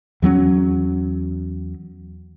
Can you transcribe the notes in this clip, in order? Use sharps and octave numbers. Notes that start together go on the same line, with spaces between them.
E2 F#3 B3 C#4